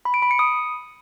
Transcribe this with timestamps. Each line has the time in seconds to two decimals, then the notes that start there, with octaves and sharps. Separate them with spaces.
0.05 B5
0.14 D7
0.22 B5
0.31 C#7
0.39 D#6